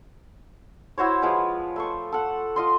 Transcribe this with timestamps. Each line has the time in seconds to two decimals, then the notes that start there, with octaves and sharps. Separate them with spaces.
0.98 E4 F#4 C5 C#5
1.22 F3 G#3 B4 F5
1.76 A3 C5 C#6
2.12 A4 F#5
2.56 F4 D#5 C6